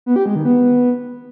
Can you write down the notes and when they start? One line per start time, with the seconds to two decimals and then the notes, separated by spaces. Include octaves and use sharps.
0.06 B3
0.16 G4
0.26 G#3
0.36 D#3
0.45 B3